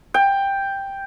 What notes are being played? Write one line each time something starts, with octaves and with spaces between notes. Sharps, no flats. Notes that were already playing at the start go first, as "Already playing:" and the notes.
G5